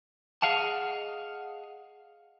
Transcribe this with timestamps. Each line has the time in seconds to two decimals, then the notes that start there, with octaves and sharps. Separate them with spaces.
0.42 G#4 D#5 F5 F#5 A5